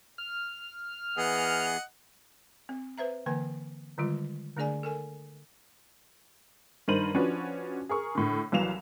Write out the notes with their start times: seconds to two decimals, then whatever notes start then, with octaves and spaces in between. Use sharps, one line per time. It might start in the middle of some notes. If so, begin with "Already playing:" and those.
0.18 F6
1.17 E3 B3 G#4 D#5 F#5
2.69 C4
2.98 B4 C5 E5 A#5
3.26 D3 E3 A#3 B4 G#5
3.98 D3 D#3 G3 G#3 F4
4.56 D3 A3 D4 G#4 D5 G#5
4.83 A4 A#4 G#5
6.88 G2 D#3 A#4 C5 D#7 F#7
7.14 F3 C#4 D4 F#4 B4
7.89 G#4 A#4 C#6
8.15 A2 D3
8.52 C2 E3 F#3 F5 E7 F7